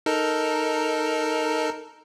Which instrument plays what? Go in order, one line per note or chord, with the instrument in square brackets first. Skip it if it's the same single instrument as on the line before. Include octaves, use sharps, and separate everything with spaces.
[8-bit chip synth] D#4 A4 A#4